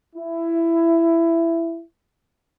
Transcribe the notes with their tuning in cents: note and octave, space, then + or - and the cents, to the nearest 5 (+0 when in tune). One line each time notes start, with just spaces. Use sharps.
E4 +15